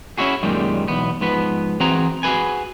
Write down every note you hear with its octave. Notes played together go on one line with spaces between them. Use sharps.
C#4 D4 E4 F#4 G#4
F#2 A#2 D#3 G3 G#3
B1 E2 B3
G#2 F3 B3 B4
E3 C4 F#4 G#4 A#5
F#4 G#4 A4 B4 G#5